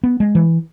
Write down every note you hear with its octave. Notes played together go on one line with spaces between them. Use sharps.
B3
G#3
E3